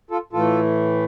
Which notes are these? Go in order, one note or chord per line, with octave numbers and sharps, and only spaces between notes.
F4 A4
A2 E3 A3 F4 A4